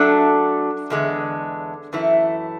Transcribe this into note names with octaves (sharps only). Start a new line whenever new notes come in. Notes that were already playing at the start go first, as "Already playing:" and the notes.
Already playing: F#3 A3 D4 A4
E2 D3 G#3
F#2 E3 A3 E4